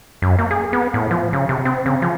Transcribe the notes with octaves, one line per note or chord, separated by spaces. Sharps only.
F#2
A#3
G#4
B3
A2
F3
C#3
C3
C4
C#3
F3